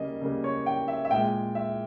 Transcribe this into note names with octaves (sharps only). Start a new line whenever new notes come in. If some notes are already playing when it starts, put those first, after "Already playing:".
Already playing: C#3 G3 A#3 D#5
C#3 G3 A#3
C#5
G5
E5
E5
A#2 G#3 G5
E5